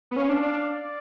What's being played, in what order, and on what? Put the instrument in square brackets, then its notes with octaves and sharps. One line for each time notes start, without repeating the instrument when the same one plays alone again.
[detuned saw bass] B3
[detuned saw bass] C#4 [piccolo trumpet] F5
[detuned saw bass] D4
D4
[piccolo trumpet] D5